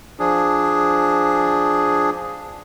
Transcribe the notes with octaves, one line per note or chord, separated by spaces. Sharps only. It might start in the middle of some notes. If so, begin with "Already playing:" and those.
F3 D4 G#4